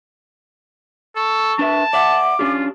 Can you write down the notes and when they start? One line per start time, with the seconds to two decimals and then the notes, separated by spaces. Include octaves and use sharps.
1.16 A4 C#6
1.59 D4 B4 E5 A5
1.93 D5 E5 F#5 D6
2.39 C#4 D4 F4 G4